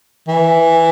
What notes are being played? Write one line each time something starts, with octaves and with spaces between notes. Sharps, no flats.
E3